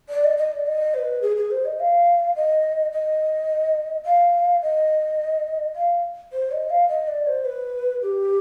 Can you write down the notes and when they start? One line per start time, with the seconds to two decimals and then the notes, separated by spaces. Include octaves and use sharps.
0.09 D5
0.24 D#5
0.38 D#5
0.52 D5
0.66 D#5
0.94 C5
0.98 B4
1.22 G#4
1.37 G#4
1.51 C5
1.65 D#5
1.80 F5
2.36 D#5
2.92 D#5
4.06 F5
4.62 D#5
5.75 F5
6.33 C5
6.52 D#5
6.70 F5
6.89 D#5
7.08 D5
7.27 C5
7.45 B4
8.02 G4